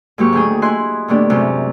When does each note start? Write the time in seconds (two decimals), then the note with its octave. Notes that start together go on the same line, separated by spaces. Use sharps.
0.18 G#2 F#3 A#3 G4 C#6 F#6
0.33 D2 D#3 A3 G#4 G5 D#6
0.62 E4 D#5 G#5 C6 F#6
1.08 A2 D3 A#3 B3 D4 G4
1.30 F#2 C3 G#3